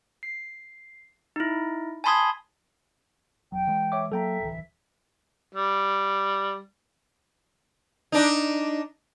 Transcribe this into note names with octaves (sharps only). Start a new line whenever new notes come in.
C7
D#4 E4
G#5 A5 B5 C6 D#6 G#6
E1 F#3 G5
E3 G#3
C#5 E5 D6
F#3 A#3 A4 E5 G5 A#5
D1 C2 E3
G3
D4 D#4